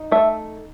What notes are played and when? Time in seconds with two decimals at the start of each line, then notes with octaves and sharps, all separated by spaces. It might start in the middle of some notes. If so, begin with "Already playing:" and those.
Already playing: D#4
0.12 A3 E5